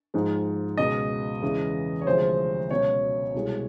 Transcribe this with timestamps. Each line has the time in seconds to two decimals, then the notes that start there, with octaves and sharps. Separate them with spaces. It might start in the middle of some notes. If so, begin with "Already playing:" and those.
0.14 G#2 F3 G#3
0.77 C#2 B2 G#3 D#5
1.42 E2 C#3 E3 G#3
2.01 C#5
2.06 D2 C3 F3 G#3 C5
2.71 C#2 B2 F#3 C#5
3.34 C2 B2 G#3